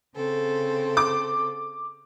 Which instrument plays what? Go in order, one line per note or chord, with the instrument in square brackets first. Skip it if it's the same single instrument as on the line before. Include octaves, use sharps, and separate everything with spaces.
[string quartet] C#3 C4 A4
[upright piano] D6